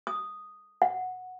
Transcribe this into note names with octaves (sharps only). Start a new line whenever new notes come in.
D#6
F#5